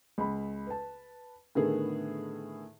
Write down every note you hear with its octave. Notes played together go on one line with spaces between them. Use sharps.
C#2 B5
B4 A5
A2 D3 D#3 B3 G#4